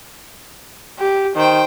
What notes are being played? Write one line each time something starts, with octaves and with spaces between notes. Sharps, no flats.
G4
D#3 C5 G5